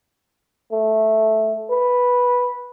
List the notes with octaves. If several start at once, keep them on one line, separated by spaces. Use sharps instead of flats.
A3
B4